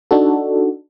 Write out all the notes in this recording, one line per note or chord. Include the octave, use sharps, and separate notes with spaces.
D4 D#4 F#4 A4